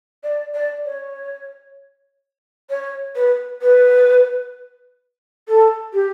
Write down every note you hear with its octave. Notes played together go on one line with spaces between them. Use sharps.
D5
D5
C#5
C#5
B4
B4
A4
G4